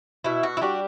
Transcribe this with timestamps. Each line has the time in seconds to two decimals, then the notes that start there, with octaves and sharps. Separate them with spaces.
0.24 B2 E4
0.43 F#4
0.57 E4
0.61 G3 D4 F#4